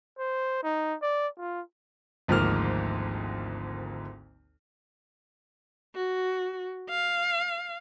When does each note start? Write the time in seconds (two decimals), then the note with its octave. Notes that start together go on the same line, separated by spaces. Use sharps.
0.18 C5
0.63 D#4
1.02 D5
1.39 F4
2.28 G#1 D2 G#2 F3 A#3 F6
5.95 F#4
6.89 F5